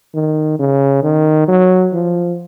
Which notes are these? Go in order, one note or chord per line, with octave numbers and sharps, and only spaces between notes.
D#3
C#3
D#3
F#3
F3